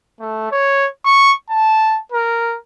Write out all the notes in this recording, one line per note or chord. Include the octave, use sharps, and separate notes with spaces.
A3
C#5
C#6
A5
A#4